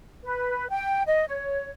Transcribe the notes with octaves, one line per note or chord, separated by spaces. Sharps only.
B4
G5
D#5
C#5